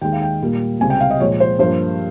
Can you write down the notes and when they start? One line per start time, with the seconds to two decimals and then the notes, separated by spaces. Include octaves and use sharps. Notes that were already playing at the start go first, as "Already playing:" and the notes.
0.02 D#2 D#3 G#3 G5
0.13 F5
0.22 G5
0.41 A#2 G3 A#3
0.80 C#2 C3 G3 G#5
0.90 G5
1.01 F5
1.11 D#5
1.20 A#2 F3 G#3 C#5
1.40 C5
1.59 G2 F3 A#3 C5